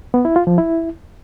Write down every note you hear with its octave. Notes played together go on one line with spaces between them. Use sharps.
B3
E4
F4
F3
E4